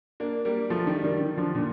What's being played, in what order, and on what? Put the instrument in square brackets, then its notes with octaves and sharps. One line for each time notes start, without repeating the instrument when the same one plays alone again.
[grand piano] A#3 D4
G3 A#3
F3 A3
D#3 G3
D#3 G3
D#3 G3
D3 F3
A#2 D3